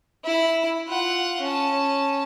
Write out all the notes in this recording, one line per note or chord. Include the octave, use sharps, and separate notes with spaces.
E4 B5
F4 F#5
C#4 A5